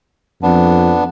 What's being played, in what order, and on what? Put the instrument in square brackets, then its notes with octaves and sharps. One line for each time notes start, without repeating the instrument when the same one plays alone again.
[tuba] F2 [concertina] B3 D4